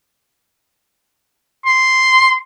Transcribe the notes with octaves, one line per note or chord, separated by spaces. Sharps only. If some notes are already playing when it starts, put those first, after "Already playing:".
C6